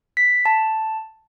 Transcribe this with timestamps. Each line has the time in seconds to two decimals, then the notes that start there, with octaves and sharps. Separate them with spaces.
0.17 B6
0.45 A5